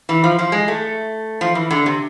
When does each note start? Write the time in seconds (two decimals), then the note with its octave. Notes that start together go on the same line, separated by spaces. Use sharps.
0.09 E3
0.24 F3
0.39 F3
0.52 G#3
0.68 A3
1.41 F3
1.55 E3
1.71 D3
1.86 C3